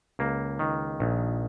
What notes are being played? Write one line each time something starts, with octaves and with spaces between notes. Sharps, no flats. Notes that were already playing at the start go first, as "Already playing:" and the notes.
C#2 A#3
D#3
A#1